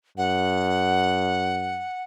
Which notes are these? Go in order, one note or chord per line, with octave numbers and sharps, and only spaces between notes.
F#2 F#5